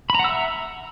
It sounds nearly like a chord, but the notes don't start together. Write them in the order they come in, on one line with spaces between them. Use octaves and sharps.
B5 A#5 F#5 E6 E5